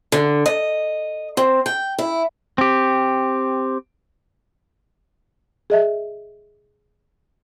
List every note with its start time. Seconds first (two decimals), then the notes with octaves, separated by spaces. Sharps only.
0.12 D3
0.46 D#5
1.37 C4
1.66 G5
1.99 E4
2.58 C4 G4
5.70 G#4 D#5 E5